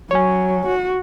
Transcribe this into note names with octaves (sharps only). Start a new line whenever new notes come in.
F#3 C#5 G#5
F#4